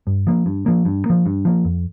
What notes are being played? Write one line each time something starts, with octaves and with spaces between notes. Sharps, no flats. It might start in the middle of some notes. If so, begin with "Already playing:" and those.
G2
F3 A#3
G2
F3 A#3
G2
F3 A#3
G2
F3 A#3
F2